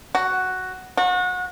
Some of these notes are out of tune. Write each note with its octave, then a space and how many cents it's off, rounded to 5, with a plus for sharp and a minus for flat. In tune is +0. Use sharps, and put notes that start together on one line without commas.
F#4 +5
F#4 -30